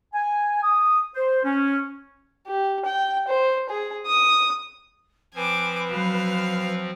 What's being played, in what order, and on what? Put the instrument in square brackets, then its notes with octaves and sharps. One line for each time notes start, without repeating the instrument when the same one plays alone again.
[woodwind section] G#5
D#6
C5
C#4
[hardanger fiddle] G4
G5
C5
G#4
D#6
[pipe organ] F3 C4 [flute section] B4 [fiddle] G#5 D6
[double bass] F#3 [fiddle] F5